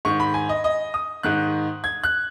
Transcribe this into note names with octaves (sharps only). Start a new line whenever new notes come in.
G#2 D#3 C#6
B5
G#5
D#5
D#5
D#6
G#2 D#3 F#6
G#6
F#6